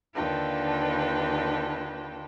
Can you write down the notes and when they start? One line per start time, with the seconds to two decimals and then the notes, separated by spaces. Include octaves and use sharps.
0.15 D#2 D3 F4 B4 G5 A5